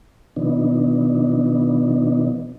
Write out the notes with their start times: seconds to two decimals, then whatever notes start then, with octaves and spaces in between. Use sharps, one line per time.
0.36 B2 D#3 F3 B3 D4 D#4